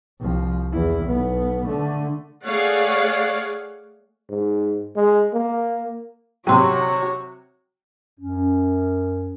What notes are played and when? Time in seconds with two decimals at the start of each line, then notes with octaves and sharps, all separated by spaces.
0.20 C2 F3
0.72 E2 E4
1.04 B1 B3
1.66 D3 A3
2.45 A3 G#4 C#5 D5 F5 F#5
4.29 G#2
4.96 G#3
5.33 A#3
6.47 C3 F#3 F#4 C#5 G5 C6
8.20 F#2 C#4